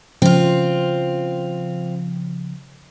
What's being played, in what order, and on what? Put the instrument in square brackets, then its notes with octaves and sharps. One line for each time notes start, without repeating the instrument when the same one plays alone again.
[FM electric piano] C#3 F3 [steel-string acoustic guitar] C4 F4